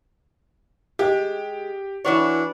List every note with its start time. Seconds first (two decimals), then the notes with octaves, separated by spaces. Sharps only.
0.99 G#3 G4
2.04 E3 D4 E4 F#4 B4 C#5